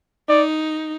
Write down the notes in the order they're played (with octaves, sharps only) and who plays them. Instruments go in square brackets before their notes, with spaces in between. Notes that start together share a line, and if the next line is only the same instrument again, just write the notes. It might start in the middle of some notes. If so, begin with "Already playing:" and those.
[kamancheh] D#4 [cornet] D5